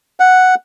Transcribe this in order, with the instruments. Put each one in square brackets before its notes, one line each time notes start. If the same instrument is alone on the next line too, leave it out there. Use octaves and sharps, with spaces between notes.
[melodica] F#5